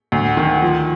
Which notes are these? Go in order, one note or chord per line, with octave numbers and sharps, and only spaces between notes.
D2
D#3
F3